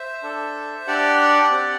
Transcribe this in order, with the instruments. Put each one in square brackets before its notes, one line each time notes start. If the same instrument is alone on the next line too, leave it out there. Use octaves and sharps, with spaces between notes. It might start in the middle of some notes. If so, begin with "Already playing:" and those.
Already playing: [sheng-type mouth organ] C5 E5
D4 A4
D4 G4 D5 F#5
C4 G4